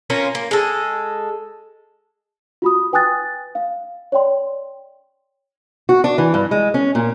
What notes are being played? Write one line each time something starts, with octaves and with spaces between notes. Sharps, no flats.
A#3 C#4 F4 A#4
A#3
G#3 A4
F4 F#4 B5 D#6
B4 G5 G#5 D#6 F#6 A6
F5
C#5 D5 G5 C6
F#4
D4
E3
G2
G#3
C#4
A#2